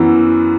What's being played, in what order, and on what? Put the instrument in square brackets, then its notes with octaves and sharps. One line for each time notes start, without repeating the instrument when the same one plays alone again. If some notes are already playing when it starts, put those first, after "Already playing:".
Already playing: [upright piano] F#2 E3 B3